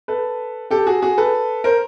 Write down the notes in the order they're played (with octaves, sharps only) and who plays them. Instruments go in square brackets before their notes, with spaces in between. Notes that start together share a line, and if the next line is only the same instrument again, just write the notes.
[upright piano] A4 B4
G4 A4
F#4 G#4
F#4 G#4
A4 B4
A#4 C5